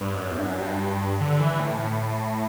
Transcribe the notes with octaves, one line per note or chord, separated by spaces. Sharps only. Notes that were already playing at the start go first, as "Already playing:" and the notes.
G2
F#2
E2
G2
F#2
G2
D3
E3
A2
A2